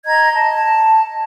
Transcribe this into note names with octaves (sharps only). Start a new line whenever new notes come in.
D#5 A#5 G#6
A5